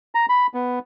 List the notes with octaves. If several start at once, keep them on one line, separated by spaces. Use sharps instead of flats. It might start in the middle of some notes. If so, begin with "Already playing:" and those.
A#5
B5
B3